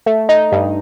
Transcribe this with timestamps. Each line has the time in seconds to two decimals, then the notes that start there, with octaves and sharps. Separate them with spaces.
0.06 A3
0.29 D#4
0.52 G2